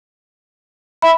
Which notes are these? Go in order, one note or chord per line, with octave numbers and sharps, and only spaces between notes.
E5 B5